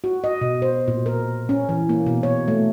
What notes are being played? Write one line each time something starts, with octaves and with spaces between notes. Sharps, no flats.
F#4
D#5
B2
C5
A#2
A#4
C#4
E3
A#3
B2
C#5
A3